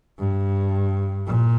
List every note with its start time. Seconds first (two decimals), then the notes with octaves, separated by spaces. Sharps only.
0.19 G2
1.27 A#2